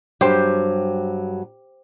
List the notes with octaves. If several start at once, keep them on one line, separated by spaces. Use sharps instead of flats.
G2 F#3 G4 C5